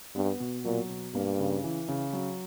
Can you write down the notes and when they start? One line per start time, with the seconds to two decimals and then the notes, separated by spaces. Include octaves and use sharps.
0.15 G2 B3
0.40 B2
0.65 A#2 F#3
0.90 B2
1.14 G2 A#3
1.39 C#3
1.64 E3
1.89 C#3
2.13 F#3